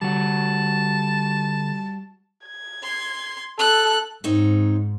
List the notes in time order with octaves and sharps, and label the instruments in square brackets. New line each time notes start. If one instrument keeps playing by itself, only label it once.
[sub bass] D3 [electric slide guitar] G3 F#4 [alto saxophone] A5
[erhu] G#6
[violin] C6
[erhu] A4 [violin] F#6
[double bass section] G#2 [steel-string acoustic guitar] C4 D#4 C#5